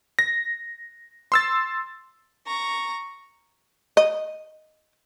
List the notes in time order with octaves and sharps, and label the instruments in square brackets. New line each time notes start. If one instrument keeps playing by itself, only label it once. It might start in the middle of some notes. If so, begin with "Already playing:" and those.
[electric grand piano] A#6
C6 E6 A6
[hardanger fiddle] A#5 C#6
[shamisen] D#5